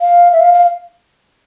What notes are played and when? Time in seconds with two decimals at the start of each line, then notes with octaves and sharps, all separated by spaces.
0.01 F5
0.33 E5
0.40 F5
0.53 F5